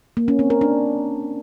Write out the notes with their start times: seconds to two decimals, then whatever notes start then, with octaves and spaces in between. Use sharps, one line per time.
0.17 A#3
0.28 C#4
0.39 C4
0.50 A#4
0.61 D4